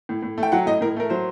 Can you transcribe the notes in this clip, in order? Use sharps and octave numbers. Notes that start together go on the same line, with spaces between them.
A2
A2
A3
G5
F#3 F#5
A2 D#5
A2 A#4
A3 A#4
F#3 C5